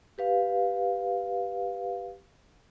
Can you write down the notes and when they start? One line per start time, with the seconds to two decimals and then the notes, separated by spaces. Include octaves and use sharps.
0.18 G4 B4 F5